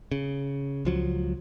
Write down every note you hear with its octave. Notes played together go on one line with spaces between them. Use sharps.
C#3
C#2 F3 F#3